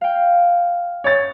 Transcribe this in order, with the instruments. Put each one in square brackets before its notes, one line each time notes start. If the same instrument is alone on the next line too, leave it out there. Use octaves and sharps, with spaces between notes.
[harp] F5 G5
[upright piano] C#5 A6